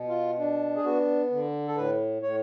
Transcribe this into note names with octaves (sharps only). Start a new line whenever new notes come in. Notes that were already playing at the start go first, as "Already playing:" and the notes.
Already playing: B2
F4
D4
G#4
B3 F#4
D3
A4
A2 B4
A2 C#5